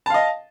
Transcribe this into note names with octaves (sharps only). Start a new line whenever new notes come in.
D#5 F5 A5